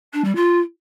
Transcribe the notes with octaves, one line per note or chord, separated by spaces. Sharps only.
D4
G3
F4